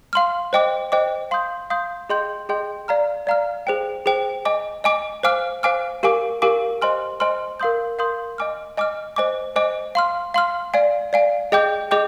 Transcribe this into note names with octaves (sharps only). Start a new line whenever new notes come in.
F5 C6 F6
C5 D#5 G5 D6
C5 D#5 G5 D6
F5 C6 D#6 G6
F5 C6 D#6 G6
G#4 D#5 G5 C6 G6
G#4 D#5 G5 C6 G6
D5 F5 A#5 F6
D5 F5 A#5 F6
G#4 C5 G5
G#4 C5 G5
D#5 G#5 D6
D#5 G#5 D6
C5 F5 G#5 D6 F6
C5 F5 G#5 D6 F6
G4 A#4 F5 G#5 D6
G4 A#4 F5 G#5 D6
C5 D#5 G#5 C6 F6
C5 D#5 G#5 C6 F6
A#4 F5 C6 D#6 G6
A#4 F5 C6 D#6 G6
D#5 G#5 D6 F6
D#5 G#5 D6 F6
C5 D#5 G#5 D6
C5 D#5 G#5 D6
F5 C6 F6
F5 C6 F6
D5 F5 G#5
D5 F5 G#5
G#4 D#5 G5 D6 G6
G#4 D#5 G5 D6 G6